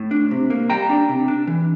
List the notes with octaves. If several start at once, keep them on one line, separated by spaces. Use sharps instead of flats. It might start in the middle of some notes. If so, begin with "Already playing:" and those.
Already playing: A2
D4
C3
A#3
G3 G5 A#5
D4
C3
D4
E3